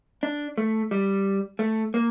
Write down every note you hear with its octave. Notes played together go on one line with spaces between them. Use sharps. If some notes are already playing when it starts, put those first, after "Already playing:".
D4
A3
G3
A3
A#3